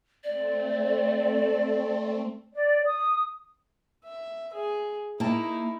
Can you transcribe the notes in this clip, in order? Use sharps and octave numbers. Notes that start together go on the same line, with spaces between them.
A3 C4 D5
D5
D#6
E5
G#4
A#3 D#4 E4 A5